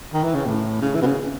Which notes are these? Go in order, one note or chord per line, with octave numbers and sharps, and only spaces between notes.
D#3
E3
C#3
A2
C#3
E3
B2
C#3